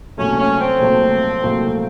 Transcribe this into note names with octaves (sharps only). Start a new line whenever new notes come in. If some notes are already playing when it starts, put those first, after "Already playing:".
C2 A#2 F#3 A3 C#4
C#4
C4
C2 A#2 F#3 A3
C2 A#2 F#3 A3